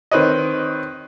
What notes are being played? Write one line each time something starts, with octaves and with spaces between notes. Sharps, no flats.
D#3 C4 B4 C#5 D#5